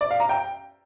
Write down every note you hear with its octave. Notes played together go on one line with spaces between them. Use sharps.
D5
F5
A#5
G5